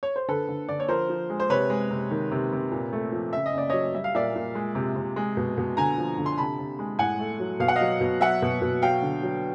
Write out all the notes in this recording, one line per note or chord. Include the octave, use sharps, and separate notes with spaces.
C#5
C5
D3 A4 B4
D3
D3 D5
C#5
F3 A#4 C5
F3
G#3
C5
C3 B4 C#5
G#3
C3
D#3
C3
C3
A#2
A3
F3
C#3 E5
D#5
C#3 D5
F#3 C#5 D#5
G3 E5
F5
A#2 D5 E5
A#2
G#3
C3
C3
G#3
B2
B2
D3 G#5 A#5
F3
D3
C6
C3 A5 B5
C3
G#3
A2 F#5 G#5
A3
F#3
B2 F5
F#5
D#5 F5
F#3
B2
F#3 E5 F#5
B2
B2
F#3 F5 G5
D3
F#3